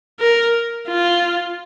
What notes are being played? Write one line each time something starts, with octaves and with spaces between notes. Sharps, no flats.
A#4
F4